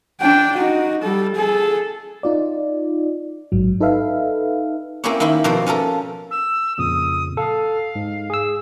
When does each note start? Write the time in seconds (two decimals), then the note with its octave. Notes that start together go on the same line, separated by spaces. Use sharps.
0.21 D4 G5
0.57 D#4 F#4
1.03 G3 A4
1.36 G#4 A4
2.23 D#4 F4 D5
3.52 A1 G#2 F#3
3.80 D#4 A4 B4 E5 F5
5.04 A#3 C4 C#4 E4 G4 C#5
5.20 D#3 A#3 E4 B5
5.44 B2 F3 A#3 C4 C5
5.66 C#4 F4 A4 A#4
6.30 E6
6.78 F2 A#2 C#3 D#6
7.37 A4 F5
7.95 G#2
8.30 G#4 E6